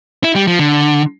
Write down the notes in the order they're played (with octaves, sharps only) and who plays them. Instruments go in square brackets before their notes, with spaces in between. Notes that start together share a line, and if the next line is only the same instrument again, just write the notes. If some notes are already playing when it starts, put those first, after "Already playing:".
[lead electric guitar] E4
G3
F3
D3